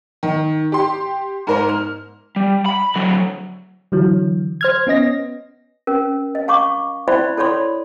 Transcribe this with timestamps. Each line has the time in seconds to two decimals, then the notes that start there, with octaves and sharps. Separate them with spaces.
0.23 D#3
0.72 G4 C6
1.47 G#2 A#4 C5
1.69 F6
2.36 G3
2.66 B5
2.96 D3 F#3
3.92 D3 E3 F#3
4.61 C5 F6 G#6
4.87 B3 C#4 D#5 A#6
5.87 C#4 A#4
6.35 D#5
6.48 F5 A#5 C#6 D6
7.08 E4 C5 D5 E5 B5 C6
7.37 E4 A4 C#5 D5 B5 C6